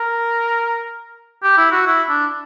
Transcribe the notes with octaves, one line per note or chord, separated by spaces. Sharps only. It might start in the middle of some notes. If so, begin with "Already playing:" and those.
Already playing: A#4
G4
E4
F#4
E4
D4